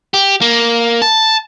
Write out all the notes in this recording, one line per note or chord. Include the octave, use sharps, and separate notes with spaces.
G4
A#3
A5